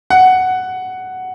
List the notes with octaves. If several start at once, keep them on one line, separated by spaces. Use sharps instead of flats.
F#5